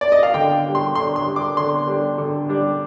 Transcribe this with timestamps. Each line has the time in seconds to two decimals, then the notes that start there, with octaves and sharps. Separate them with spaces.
0.01 D5
0.12 D#5
0.23 F5
0.34 D3 G5
0.65 G3 D4
0.75 C6
0.95 D3 C6
1.16 C6
1.26 G3 D4
1.36 D6
1.57 D3 C6
1.88 G3 D4
2.18 D3
2.49 G3 D4